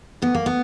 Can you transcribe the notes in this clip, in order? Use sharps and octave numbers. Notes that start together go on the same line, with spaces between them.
D2 B3
A#3
B3